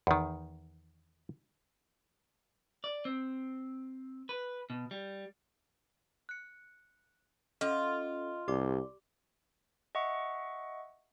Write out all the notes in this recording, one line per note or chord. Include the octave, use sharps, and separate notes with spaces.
E2 D#3
D5
C4
B4
B2
G3
F#6 C#7
C#4 F4 A4 D#5
C2 G4 D5 D6
D#5 E5 F#5 C#6